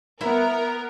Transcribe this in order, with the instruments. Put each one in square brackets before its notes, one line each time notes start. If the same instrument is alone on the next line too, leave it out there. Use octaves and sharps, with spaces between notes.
[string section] B3 A#4 [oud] E4 E5